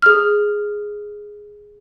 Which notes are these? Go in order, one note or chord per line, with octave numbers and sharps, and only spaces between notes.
G#4 F6